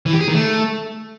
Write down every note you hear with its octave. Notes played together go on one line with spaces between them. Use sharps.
E3
G4
G#4
D#3
A3